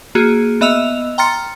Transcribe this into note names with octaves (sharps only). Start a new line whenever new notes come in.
A#3 F#4 G#4
B3 D#5 E5 E6 F7
G5 A#5 C6 F6 A6 C#7